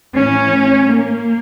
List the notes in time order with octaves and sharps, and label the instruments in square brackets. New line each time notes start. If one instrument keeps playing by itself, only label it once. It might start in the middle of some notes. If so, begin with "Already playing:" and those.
[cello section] A2 E3 C#4
A#3